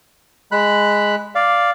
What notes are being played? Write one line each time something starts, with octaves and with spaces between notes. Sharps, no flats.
G#3 B5 F#6
D5 F5